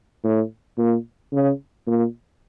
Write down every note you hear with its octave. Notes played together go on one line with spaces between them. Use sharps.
A2
A#2
C#3
A#2